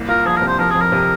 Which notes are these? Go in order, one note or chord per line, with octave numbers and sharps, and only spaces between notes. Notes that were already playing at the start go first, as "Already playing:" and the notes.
Already playing: C2 A#3
F4 A#4
F3 G#4
A#4
C3
C5
F3 A#4
F2 G#4
A#4
C3